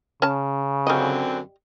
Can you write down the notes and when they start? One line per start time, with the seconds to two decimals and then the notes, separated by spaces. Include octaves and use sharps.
0.22 C#3 C#4 A5
0.87 F#2 D3 G3 C4 D#5